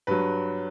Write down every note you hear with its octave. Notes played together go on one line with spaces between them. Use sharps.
G2 F#3 B4